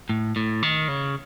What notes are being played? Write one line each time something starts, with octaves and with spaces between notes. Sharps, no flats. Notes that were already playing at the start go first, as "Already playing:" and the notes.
A2
A2
D#3
C#3